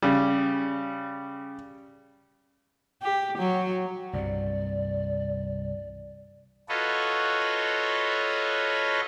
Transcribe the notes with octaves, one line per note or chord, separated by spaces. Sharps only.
C#3 G3
G4
F#3
C2 G2 C3 D5
F4 F#4 A4 B4 C#5 D#5